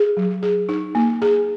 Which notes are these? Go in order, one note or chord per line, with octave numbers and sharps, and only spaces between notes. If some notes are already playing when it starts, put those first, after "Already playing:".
Already playing: G#4
F#3
G#4
D#4
A#3
G#4